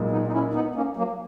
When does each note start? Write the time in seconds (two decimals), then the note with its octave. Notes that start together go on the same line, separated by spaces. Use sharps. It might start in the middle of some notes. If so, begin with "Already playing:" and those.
Already playing: B1 A#2 G#3
0.11 B3 D#4
0.27 D#4
0.32 C#4 E4
0.53 B3 D#4
0.75 A#3 C#4
0.97 F#3 A#3